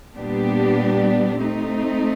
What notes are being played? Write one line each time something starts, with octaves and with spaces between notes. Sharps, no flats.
A#2 G3 B3 D4 G4
A3 C4 D#4